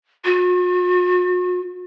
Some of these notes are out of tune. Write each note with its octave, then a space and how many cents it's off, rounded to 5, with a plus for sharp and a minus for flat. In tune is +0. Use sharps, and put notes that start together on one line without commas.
F#4 -45